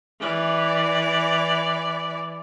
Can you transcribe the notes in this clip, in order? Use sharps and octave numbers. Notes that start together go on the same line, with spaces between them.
E3 D5